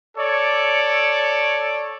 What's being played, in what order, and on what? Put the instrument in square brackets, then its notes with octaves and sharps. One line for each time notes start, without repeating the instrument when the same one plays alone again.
[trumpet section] A4 C#5 D5